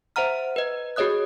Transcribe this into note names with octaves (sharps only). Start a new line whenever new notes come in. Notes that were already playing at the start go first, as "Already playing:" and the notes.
C5 E5 F#5 A#5 F6
B4 D#5
F#4 G#4 C#5 D#5 D#6 F#6